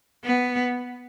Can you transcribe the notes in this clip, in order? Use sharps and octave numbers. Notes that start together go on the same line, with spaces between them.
B3